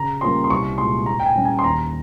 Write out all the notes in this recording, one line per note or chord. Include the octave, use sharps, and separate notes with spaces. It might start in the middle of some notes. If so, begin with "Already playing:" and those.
Already playing: C#3 A#5
G3 A#3 C#4 F4 C6
C6
C2 C#6
A#2 G#3 C6
A#2 A#5
G5
G#5
G3 C#4
G#5
C6
D#2 A#5